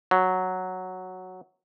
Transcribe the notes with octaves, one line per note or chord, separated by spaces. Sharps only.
F#3